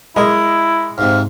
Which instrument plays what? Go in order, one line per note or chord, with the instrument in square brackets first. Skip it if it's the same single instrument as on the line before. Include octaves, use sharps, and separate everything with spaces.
[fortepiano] G#3 D#5 [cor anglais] E4 [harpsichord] A#4
[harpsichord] G#2 C3 [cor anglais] F5